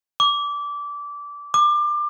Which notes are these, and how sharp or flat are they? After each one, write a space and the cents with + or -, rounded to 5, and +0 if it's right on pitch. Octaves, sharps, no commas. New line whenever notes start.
D6 -20
D6 +25